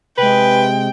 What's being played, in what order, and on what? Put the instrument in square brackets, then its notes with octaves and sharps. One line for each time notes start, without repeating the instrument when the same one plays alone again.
[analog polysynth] C3 G#3 [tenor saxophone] B4 [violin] G5